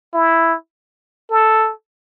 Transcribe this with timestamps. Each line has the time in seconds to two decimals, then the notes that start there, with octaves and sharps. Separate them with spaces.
0.14 E4
1.30 A4